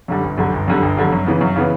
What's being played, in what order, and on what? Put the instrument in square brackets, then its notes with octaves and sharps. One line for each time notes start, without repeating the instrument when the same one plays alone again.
[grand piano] F#2 D3 G3
G1
F#2 D3 G3
G1
F#2 D3 G3
G1
F#2 D3 G3
F#2
C#3 E3 B3
F#2
C#3 E3 B3